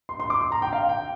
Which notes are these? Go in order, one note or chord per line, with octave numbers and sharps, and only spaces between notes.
C6
C6
D6
C6
A#5
G5
F5
G5